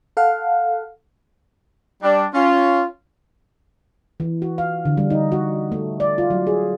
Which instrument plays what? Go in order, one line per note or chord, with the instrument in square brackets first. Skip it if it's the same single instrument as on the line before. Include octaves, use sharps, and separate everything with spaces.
[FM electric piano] A4 F5 F#5
[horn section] G3 D4
C#4 F4
[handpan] E3
F#4
F5
D3
G3
D#4
F#4
A3
D5
F4
F#3
G#4